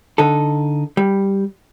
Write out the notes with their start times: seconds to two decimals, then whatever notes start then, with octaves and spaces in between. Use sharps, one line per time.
0.18 D3 D#4 A4
0.97 G3